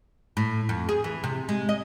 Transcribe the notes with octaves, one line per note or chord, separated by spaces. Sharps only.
A2
F2
G#4
E3
C3
G#3
D#5